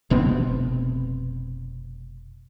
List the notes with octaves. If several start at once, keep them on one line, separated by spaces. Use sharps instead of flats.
F1 B2 B3 C4